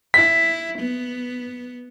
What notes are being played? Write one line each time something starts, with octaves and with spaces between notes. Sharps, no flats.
E4 B6
B3